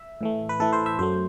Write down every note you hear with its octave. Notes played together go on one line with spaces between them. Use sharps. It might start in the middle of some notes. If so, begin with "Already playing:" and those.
Already playing: E5
A2 E3 A3
B4
A2 E3 A3 A4
C5
E5
F#2 F#3 A3 C5